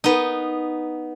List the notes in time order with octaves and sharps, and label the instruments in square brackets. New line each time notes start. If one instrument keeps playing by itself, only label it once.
[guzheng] B3 D#4